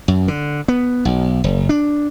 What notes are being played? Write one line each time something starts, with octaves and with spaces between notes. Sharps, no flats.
F#2
D3
B3
B1
F#1
D4